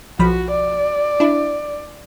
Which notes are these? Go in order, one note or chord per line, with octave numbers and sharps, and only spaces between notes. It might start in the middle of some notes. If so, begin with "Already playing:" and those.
B1 F3 F#4 B5
D5
D4 E4